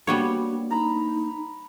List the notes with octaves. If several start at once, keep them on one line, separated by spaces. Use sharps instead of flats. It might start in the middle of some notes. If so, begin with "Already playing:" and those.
G3 A#3 B3 D4 F#4 C#5
D#4 A#5 B5